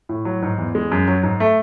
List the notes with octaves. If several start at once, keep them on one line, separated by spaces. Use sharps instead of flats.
A2
F#3
G#2
E2
G#3
F#2
F#3
G#2
A3